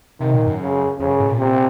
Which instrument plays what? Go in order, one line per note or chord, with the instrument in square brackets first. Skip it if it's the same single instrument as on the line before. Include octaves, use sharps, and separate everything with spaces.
[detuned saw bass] C3 [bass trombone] D#3
[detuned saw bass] A#2
F#2
[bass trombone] C#3
[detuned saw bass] F2 [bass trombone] C#3
[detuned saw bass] F#2
A2
A#2
[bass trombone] C3